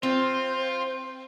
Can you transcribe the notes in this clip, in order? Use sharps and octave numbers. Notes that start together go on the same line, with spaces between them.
C4 F4 C5 C6